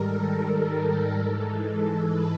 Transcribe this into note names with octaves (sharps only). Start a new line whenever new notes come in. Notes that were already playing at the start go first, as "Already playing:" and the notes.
Already playing: G#2 D#3 G3 A4 A#4
A4
G#2 E3 G#3
B4